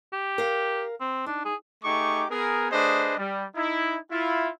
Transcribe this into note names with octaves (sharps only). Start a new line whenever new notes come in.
G4
A#4 F5
C4
D4 D#4
G#4
A3 D#4 G4 G#4 C#6 D6
B3 G#4 A#4
A3 D4 G#4 B4 C5 D#5
G3
D#4 E4
E4 F4